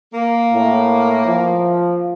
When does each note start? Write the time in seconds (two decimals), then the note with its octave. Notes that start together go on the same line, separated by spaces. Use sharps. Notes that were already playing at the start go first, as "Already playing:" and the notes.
0.14 A#3
0.53 A2
1.26 F3